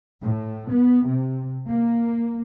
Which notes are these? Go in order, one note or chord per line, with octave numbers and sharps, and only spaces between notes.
A2
B3
C3
A#3